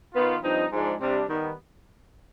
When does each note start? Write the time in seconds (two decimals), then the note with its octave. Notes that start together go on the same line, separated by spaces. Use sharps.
0.14 D#3 B3 F4
0.43 G2 F3 C4 D#4
0.72 G#2 F3 G#3 D4
1.01 C3 G3 D4
1.29 D#3 G3 B3